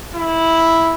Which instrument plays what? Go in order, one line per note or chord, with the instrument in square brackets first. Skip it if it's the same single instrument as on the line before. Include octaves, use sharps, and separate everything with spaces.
[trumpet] E4